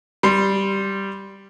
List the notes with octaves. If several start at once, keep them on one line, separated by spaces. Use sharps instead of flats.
G3 C6